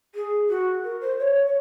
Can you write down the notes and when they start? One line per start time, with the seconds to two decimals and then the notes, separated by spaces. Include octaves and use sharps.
0.15 G#4
0.49 F#4
0.84 A#4
1.01 C5
1.19 C#5
1.46 C#5